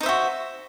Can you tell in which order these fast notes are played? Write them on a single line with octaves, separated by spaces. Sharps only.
D#4 C5 E5 F#4